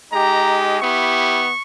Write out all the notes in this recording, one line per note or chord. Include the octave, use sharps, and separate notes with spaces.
G#3 D#4 G4 A#5
B3 E4 G4 C#6